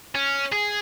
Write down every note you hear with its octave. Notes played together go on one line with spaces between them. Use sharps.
C#4
G#4